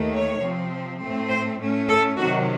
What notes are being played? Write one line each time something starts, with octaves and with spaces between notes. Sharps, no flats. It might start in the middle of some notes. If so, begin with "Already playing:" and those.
Already playing: D#2 D#3 A3
C#5
C3 F3 C4
A2 A3 C4
C5
A2 A3 C#4
A4
C3 D#3 F#3 F#4